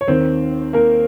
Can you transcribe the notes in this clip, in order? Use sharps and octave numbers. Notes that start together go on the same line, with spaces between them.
C#5
D#2 D#3 C4 C5
A#3 A#4